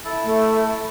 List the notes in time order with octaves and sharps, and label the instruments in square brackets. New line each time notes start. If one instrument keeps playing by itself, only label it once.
[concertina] E4 A4
[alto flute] A3